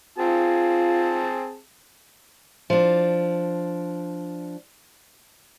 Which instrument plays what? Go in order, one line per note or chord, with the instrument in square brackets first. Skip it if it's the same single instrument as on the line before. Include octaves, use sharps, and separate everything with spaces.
[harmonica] C4 G#4 A5 [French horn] F4
[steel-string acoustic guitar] F3 D4